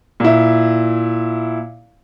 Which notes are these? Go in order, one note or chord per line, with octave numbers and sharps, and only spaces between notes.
A#2 E4